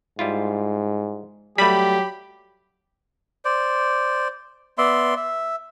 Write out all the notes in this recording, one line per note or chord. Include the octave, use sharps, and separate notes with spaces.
G#2 G3 E4 F4
F#3 G3 A3 G4 B5
C5 D5
B3 D5 E5 C6
E5